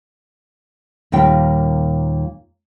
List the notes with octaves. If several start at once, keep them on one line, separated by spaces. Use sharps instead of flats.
D#2 A#2 G3 D#4 G5